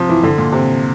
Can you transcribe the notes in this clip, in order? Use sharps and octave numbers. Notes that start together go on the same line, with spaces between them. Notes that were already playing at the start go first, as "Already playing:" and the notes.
Already playing: C3 F3
E3
D3
A#2
C3